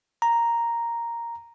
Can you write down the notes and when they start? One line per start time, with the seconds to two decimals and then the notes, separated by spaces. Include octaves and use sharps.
0.22 A#5